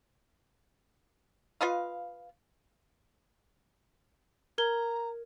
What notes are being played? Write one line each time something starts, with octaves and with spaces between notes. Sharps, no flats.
F4 B4 D#5 F5
A#4 A#5 G#6 G7